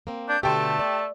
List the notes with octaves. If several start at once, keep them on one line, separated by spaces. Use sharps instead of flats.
A#3 C4
D4 G6
B2 D3 A3 G4 G5 A5 C6
D5